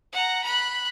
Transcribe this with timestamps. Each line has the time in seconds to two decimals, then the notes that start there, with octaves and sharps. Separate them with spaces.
0.13 F#5 A#5
0.44 B5 F#6